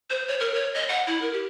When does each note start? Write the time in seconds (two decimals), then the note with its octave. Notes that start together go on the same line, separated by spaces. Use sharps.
0.10 C5
0.28 C#5
0.40 A#4
0.54 C#5
0.74 D#5
0.88 F#5
1.07 E4
1.22 A#4
1.33 G4